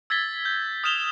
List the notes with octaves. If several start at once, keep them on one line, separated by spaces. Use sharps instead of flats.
E6 G#6 A6 B6 G7
G6
D#6 F6 G6 E7 F7 G7